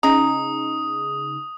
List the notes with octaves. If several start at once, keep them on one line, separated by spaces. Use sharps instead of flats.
C#3 G#3 D#4 G#4 A#5 D#6